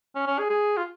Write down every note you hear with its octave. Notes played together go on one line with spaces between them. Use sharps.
C#4
C#4
G#4
G#4
F4